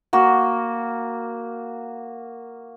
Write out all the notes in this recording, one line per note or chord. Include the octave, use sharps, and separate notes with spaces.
A#3 F#4